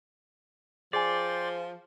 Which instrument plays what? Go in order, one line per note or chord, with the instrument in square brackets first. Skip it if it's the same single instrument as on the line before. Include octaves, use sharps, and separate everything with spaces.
[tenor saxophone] F3 [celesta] G#4 G#5 [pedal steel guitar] D5 [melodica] G5 C6